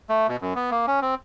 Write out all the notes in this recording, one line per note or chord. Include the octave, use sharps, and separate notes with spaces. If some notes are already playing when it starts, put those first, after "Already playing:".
A3
B2
F#2
B3
A#3
C#4
C4